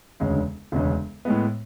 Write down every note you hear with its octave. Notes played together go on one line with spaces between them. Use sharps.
E1 D2 C#3 G#3 C#4
E1 D2 C#3 G#3 C#4
A2 G#3 B3